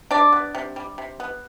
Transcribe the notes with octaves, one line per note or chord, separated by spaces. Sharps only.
C3 D4 D5
B3
C3
G3
C3
B3